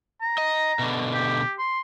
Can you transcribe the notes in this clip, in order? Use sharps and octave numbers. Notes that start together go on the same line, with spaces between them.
A#5
D#5
B2 D3
G4
C6